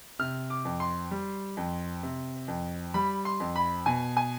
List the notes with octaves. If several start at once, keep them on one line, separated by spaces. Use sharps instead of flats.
C3 F6
D6
F2
C6
G3
F2
C3
F2
G3 B5
C6
F2
B5
B2 G#5
G#5